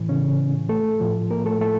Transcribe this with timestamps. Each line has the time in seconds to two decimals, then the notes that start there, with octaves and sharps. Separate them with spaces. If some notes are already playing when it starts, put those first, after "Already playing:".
Already playing: A2 E3
0.09 C#3 C#4
0.69 A3 A4
1.00 A2 F3
1.30 A#3 A#4
1.46 A3 A4
1.61 A3 A4